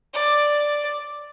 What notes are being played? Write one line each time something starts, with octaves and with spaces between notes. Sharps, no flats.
D5